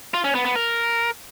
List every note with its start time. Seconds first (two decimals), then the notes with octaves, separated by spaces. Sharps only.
0.14 F4
0.24 C#4
0.35 B3
0.45 B3
0.56 A#4